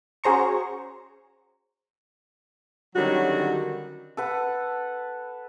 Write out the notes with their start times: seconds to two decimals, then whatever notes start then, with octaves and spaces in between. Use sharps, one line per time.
0.24 C#4 F#4 G#4 C5 A#5 C#6
2.96 D3 D#3 F#3 G3 C#4 F#4
4.17 A4 B4 F#5